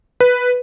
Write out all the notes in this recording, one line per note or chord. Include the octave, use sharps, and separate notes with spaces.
B4